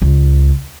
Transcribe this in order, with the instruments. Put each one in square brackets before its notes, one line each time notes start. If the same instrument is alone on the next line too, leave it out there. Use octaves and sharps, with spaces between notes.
[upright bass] C#2